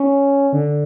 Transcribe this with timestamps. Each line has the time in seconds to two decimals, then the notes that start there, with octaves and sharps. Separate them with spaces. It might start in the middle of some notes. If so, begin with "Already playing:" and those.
Already playing: C#4
0.53 D3